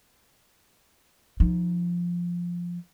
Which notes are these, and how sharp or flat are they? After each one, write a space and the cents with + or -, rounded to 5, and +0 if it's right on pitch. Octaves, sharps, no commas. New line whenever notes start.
F3 +0 D#4 +0